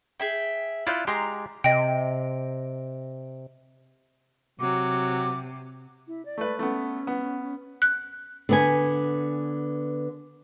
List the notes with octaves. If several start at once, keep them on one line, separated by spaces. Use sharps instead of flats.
G#4 E5 G5
E4 F4 D5 F#6 G6
G#3 G4 A#5 C6
C3 D#5 G5
C3 F#3 D6
E4
D5
A3 B4
A3 B3 C#4
B3
F#6
D3 B3 G#5